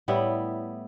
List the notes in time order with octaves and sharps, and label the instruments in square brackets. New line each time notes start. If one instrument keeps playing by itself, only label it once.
[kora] A2 G3 B3 E4